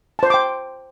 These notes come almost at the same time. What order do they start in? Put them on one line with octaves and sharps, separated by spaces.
A5 C5 C6 D6 G5